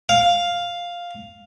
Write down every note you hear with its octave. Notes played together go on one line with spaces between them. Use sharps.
F5